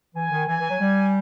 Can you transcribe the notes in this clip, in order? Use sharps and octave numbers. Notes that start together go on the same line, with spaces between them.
E3 G#5
D#3
E3 G#5
E3
F#3
G3